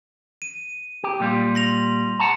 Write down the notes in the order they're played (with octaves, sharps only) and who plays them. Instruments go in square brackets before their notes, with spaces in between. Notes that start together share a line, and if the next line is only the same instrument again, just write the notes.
[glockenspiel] D#7
[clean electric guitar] G4
A#2 G3 F4
[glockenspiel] C6 A#6 F7
[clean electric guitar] F#5 A5 A#5